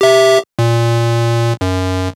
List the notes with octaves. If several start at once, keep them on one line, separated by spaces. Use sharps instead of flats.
G4 E5
A#2
F#2